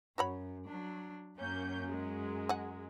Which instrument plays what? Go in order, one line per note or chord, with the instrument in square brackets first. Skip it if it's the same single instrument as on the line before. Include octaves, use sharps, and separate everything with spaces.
[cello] F#2 [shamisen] F#4 C#5 B5
[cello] F#3 D4
[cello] F#2 F#3 [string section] A#3 C#4 G6
[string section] G#3
[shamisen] F#5 G#5